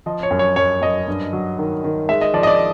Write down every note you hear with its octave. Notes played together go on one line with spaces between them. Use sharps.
F3 D#5
C#5
F#2
C#5
F#2 C#5
F#2 D#5
G2
F#3
D#3
D#3
G#3 E5
D#5
F3 D5
D#5
D5